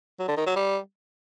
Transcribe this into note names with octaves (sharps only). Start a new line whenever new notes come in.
F#3
D3
D#3
F#3
G3